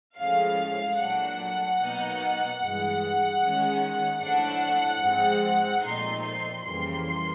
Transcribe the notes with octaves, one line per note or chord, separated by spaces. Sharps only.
A2 F3 G#3 C#4 F5
A#2 F#3 A3 D4 F#5
B2 F#3 A#3 D#4
G2 E3 G#3
D#3 G#3 C#4
A2 F3 A3 D4 F#5
G#2 F3 G#3 C4
A#2 F3 A3 C4 D#4 C6
F2 C#3 E3 G3 A#3 C6